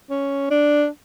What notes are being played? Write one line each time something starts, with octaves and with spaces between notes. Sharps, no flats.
C#4
D4